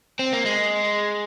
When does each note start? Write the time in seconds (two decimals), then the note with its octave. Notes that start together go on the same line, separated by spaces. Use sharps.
0.19 C4
0.32 A#3
0.45 G#3